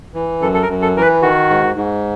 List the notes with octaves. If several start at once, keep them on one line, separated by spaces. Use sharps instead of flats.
E3
F#2 A4
A4
A#4
F#2
A4
E3 A#4
B4
D#3 F#4
G#2
G#2